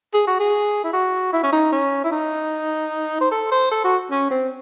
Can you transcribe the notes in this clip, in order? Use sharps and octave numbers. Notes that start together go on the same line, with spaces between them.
G#4
F#4
G#4
E4
F#4
E4
C#4
D#4
C#4
E4
D#4
C5
A4
C5
A4
F#4
C#4
C4